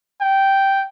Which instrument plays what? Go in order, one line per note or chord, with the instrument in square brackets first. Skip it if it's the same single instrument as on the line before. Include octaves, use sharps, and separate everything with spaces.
[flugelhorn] G5